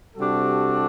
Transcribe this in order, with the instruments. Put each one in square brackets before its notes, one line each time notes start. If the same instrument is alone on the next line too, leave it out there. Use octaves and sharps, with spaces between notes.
[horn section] C3 G3 D4 F#4 A4